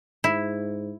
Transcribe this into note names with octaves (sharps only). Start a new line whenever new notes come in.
G#2 E4